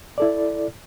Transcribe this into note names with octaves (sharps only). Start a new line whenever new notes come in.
E4 A4 D5